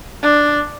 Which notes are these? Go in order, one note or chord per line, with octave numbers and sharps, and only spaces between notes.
D4